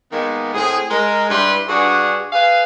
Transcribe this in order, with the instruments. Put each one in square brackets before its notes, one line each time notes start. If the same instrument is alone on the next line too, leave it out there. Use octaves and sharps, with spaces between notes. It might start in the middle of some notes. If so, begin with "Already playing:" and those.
[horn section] D#3 G#3 A#3 B3
A2 C4 G#4
G#3 A#4
G2 G3 E4 B4 C6
G2 D4 F#4 G#4 F#5
G#4 B4 F5